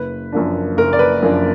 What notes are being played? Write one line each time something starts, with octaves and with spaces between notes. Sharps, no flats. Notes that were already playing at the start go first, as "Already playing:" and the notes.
Already playing: F#1 B4
F#2 F3 A#3 D4
F#1 A#4
D5
B4
F#2 F3 A#3 D4